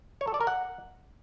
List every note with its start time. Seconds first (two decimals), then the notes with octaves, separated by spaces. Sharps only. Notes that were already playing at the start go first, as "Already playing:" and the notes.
0.21 C#5
0.27 A4
0.34 D5
0.41 A#4
0.47 F#5